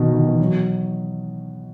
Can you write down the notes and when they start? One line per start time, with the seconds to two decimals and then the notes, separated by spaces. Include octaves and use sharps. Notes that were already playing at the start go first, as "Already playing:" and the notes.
Already playing: B2 D#3
0.14 D#3
0.27 E3
0.40 F#3